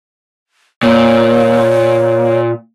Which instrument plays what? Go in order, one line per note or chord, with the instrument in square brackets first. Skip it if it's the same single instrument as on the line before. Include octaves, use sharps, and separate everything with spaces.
[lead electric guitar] A#2 [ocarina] C#5